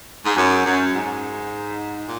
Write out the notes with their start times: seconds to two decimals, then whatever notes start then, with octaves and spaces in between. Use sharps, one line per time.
0.25 G#2
0.36 F#2
0.64 F#2
0.92 G#2
2.04 A#2